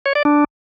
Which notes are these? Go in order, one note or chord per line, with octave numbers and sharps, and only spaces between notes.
C#5
D5
D4